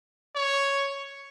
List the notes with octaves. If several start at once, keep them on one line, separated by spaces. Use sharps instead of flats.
C#5